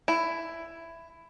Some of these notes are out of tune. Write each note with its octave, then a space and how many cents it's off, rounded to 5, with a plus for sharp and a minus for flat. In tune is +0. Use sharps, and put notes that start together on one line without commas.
E4 +10